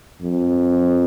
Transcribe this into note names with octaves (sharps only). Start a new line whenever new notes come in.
F2